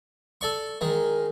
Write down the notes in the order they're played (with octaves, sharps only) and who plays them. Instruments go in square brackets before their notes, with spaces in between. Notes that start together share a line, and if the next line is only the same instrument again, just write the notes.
[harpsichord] A4 D5 C#6
[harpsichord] D#3 G#3 [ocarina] A#4